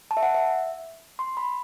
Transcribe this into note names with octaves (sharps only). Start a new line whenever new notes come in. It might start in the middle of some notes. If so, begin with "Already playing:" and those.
A5
E5
F#5
E5
C6
B5